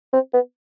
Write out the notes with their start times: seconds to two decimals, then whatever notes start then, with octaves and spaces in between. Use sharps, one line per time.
0.13 C4
0.33 B3